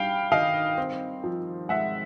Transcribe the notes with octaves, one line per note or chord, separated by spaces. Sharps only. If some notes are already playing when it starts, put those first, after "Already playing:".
Already playing: G3 D4 F5 G5 B5
D#3 D#5 F5
C4
F3
G#3 E5 F#5